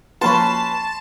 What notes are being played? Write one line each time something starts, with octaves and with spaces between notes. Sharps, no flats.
F3 A#3 C#4 F#4 B4 A5 B5 C6